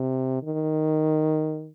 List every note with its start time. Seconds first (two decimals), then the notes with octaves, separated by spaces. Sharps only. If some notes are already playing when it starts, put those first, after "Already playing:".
Already playing: C3
0.43 D#3